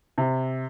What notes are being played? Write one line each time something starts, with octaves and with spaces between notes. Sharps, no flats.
C3